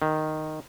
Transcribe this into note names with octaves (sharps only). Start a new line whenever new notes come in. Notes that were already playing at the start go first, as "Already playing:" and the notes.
D#3